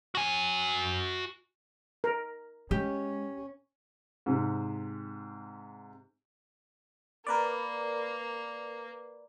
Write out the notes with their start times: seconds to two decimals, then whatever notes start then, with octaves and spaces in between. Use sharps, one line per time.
0.15 F#4 G#5
2.04 A#4
2.71 G#3 C#4 G4
4.26 G#2 C3
7.27 A#3 A#4 B4 D5